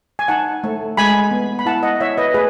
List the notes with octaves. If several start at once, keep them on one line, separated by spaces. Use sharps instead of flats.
G#5
D#4 F#5 A5
A3
G#3 G#5 B5
B3
B5
E4 F#5 A5
D#5 F#5
E4 C#5 E5
B4 D#5
A3 G#4 B4